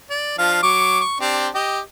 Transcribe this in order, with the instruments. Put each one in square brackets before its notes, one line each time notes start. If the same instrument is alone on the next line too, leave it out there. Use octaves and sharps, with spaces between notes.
[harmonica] D5
F3 D4 F5
F#3 C#6 D6
C#6
C4 D4 G4
G4 D#5